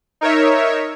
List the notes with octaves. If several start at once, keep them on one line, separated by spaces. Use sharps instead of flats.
D#4 A#4 C#5 E5